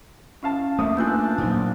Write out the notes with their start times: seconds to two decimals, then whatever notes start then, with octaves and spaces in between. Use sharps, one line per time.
0.43 C#4 E4 F5 A5
0.79 A3 A#3 E5 D#6
0.97 B3 D4 F4 G#5 E6 F#6 G6
1.38 A#2 F3 F#3 A#3 D#4